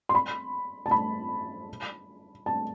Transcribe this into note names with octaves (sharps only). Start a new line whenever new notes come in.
C6
B5
A5
B5
A5